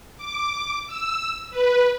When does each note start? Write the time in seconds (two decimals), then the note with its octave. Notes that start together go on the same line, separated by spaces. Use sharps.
0.17 D6
0.87 E6
1.51 B4